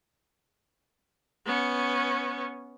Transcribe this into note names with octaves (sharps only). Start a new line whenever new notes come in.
B3 C#4